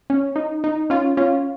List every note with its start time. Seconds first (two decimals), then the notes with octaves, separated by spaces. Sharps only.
0.10 C#4
0.36 D#4
0.64 D#4
0.90 C#4 F4
1.17 C#4 F4